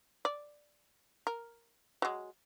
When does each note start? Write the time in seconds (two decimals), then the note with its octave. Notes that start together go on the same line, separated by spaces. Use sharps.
0.25 D5
1.27 A#4
2.02 F#3 G#3